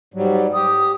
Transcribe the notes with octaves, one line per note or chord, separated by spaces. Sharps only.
G#2 F#3 G3
G4 D#6